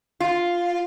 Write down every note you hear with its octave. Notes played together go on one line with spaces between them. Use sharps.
F4